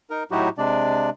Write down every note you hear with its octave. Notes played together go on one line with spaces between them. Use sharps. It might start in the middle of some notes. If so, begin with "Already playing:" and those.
D#4 A#4
A2 F#3 D#4 E4 F#4 G4
C3 G#3 D4 D5